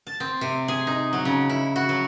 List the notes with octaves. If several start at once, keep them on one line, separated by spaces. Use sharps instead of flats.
A5
C4
C3
G#4
D#4
F#3
C#3
E4
F#4
F#3